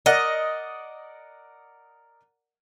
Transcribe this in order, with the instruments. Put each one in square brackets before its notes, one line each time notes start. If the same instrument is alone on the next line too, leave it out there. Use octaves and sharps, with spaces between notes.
[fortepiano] A#4 D5 F#5 [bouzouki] D#5